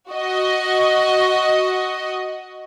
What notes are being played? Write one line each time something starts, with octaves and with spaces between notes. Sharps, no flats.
F#4 D#5